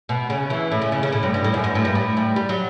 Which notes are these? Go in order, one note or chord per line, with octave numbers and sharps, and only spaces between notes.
B2
C#3
E3
A2
C#3
C#3
C#3
A2
G2
G2
A2
F#2
G2
A2
G2
A2
G3
G3
F#3